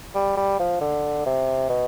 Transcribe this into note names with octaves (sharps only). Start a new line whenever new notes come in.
G3
G3
F3
D3
C3
B2